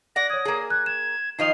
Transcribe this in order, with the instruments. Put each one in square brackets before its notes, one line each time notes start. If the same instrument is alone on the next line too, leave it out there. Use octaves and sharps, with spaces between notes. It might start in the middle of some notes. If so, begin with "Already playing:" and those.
[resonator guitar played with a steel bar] D5 F#5 [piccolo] A#6
[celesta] C#5 G#6 [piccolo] D#6
[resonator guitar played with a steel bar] A#3 G#4
[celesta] F#6 [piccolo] G#6
[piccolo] G#6 [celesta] E7
[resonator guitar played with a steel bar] D#3 F3 D#5 [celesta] D#4 F7 [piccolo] C7